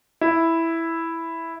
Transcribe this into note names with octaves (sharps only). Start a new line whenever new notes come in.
E4